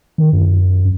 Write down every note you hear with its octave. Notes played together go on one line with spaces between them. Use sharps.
D#3
F#2